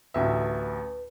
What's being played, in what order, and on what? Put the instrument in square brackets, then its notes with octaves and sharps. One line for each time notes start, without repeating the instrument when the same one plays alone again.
[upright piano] A1 D2 E5 [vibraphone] B4